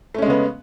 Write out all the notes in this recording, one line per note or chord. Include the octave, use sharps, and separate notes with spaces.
C#3 G#3 A3 B3 C#4